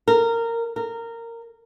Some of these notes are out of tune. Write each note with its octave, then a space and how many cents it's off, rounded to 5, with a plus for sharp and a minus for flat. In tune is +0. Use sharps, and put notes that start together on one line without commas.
A#4 -15
A#4 -15